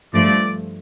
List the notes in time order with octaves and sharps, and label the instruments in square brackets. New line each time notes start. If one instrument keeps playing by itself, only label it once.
[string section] G2 F3 A3 [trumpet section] D5